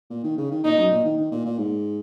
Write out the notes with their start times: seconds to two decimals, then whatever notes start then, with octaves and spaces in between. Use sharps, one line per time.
0.10 A#2
0.24 D#3
0.37 C#3
0.51 D#3
0.64 A#2 D#4
0.77 F#2
0.91 A#2
1.04 D#3
1.18 D#3
1.31 A#2
1.45 A#2
1.58 G#2